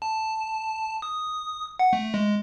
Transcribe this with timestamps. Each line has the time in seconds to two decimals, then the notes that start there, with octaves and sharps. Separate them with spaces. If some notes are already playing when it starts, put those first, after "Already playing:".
0.02 A5
1.02 D#6
1.79 F#5
1.93 A3
2.14 G#3